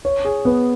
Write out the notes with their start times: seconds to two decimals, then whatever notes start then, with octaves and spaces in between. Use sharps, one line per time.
0.05 C#5
0.25 G#4
0.45 B3